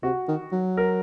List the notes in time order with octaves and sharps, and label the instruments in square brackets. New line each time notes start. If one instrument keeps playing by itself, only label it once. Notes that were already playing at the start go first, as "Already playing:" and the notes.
[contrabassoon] C3 [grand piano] F#4
[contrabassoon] D#3
F#3
[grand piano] A#4